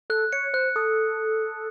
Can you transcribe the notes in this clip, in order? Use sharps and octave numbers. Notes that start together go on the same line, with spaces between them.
A4 F#6
C#5 C#7
C5 F#6
A4 D#6